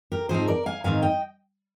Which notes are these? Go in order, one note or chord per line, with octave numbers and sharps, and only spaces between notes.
G4 A#4
G#2 F3 C4 D#4 G#4 C5
A#4 D5
F5 G#5
G#2 D#3 G#3 C4 D#4 F5 G#5
D#5 G5